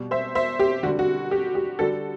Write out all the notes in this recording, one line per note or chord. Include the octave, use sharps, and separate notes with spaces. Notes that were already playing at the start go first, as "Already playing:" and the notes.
Already playing: B2 G3
C5 E5
C5 E5
G4
D3 G3 F#4
F#4
G4
G4
D3 G3 F#4 A4